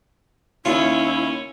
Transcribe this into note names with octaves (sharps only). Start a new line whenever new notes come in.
D#2 C#4 E4 F4